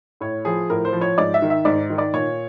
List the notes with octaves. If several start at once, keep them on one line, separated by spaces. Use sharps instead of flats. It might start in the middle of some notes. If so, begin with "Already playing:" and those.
A2 C#5
F3 G#4
A2 A#4
C5
F3
C#5
G#2 D5
E5
D#3
E5
G#2 D5
D#3
D5
A#2 C#5